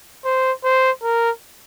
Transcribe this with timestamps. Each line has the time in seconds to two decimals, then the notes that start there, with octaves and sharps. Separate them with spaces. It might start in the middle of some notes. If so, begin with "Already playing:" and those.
0.25 C5
0.64 C5
1.03 A#4